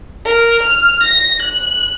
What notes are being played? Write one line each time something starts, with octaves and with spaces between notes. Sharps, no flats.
A#4
F6
A#6
F#6